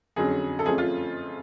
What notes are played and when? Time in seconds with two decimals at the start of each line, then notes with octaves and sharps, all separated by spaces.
0.16 F2 D3 F#3 C#4 G#4
0.59 A4
0.65 F2 F3 A3 C#4 G#4
0.78 F4